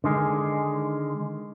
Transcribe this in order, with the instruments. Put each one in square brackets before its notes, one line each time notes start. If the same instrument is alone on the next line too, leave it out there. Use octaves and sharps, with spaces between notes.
[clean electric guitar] D3 D#3 G#3